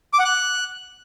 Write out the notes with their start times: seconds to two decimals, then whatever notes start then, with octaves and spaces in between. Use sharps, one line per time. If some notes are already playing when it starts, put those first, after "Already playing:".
0.13 D6
0.19 F#5
0.25 F#6